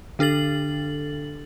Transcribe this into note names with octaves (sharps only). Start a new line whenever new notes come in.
D3 D4 A4 A6 F#7